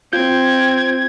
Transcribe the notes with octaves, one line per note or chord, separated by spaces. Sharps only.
C4 F4 G6 G#6